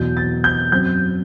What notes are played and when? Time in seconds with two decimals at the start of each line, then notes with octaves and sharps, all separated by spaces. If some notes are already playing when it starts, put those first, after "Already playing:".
Already playing: E2 B2 F#3 G6
0.17 A6
0.44 G6
0.72 F#2 F#3 C4 G6